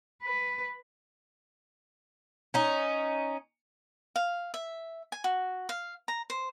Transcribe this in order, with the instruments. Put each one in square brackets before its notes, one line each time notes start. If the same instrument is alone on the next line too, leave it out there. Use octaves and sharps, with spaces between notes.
[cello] B4
[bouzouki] C#4 D#4
[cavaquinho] F5
E5
G#5
F#4
F5
A#5
C5